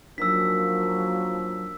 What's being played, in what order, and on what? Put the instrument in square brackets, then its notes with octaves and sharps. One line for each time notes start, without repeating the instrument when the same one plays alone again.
[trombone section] F3 A#3 [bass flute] F#3 [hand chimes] D4 D#4 A#4 [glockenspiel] E6 B6